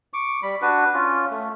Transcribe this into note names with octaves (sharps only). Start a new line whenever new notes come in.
C#6 D6
G3 B5
D4 F#4 B4
C#4 F4
A3